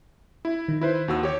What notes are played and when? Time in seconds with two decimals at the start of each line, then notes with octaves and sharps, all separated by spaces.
0.45 E4
0.68 D#3
0.81 E4 B4 C5
1.08 D#2 F#4 E6
1.23 G4 C#5